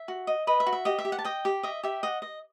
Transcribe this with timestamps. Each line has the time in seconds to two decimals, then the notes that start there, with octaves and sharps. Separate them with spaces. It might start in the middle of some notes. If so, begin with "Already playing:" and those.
Already playing: E5
0.08 F#4
0.27 D#5
0.47 B4 D#5
0.60 E5
0.67 F#4
0.73 E5
0.85 G4 D#5
0.99 E5
1.05 G4
1.12 F#5
1.19 A5
1.24 D#5 G5
1.45 G4
1.63 D#5 E5
1.83 G4 E5
2.03 D#5 F#5
2.22 D#5